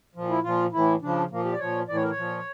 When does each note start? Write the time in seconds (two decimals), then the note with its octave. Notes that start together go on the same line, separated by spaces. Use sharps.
0.15 A#2 F3
0.30 E4
0.43 A#2 F3 F4
0.72 A2 E3 E4
1.02 C#3 F3 D4
1.31 A#2 F3 A#3
1.45 G4
1.53 D5
1.59 A#2 F3 C#5
1.88 A2 E3 D5
1.96 C#5
2.03 A#4
2.10 C#5
2.17 A#2 F3